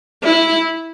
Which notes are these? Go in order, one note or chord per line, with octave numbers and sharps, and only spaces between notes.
E4